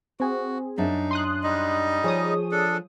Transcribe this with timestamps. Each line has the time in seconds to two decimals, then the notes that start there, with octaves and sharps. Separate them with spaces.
0.20 C4 F#4 G#4
0.78 F#2 D4 D#4 E5
1.11 C6 D#6 F#6
1.44 G3 D#4 D#5
2.04 F3 G#4 C#5 D#6
2.52 D4 A4